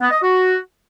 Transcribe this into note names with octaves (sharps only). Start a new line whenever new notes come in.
B3
D#5
F#4